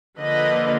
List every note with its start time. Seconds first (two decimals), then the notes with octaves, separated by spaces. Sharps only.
0.18 D3 F3 A#3 B4 D#5